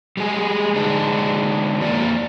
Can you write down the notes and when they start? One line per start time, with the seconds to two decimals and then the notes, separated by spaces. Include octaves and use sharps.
0.17 G3 G#3 G#4
0.76 D3 G#3 D4 D#4
1.81 F2 A#3 D5